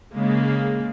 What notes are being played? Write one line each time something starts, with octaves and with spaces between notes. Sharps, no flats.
C#3 G#3 A#3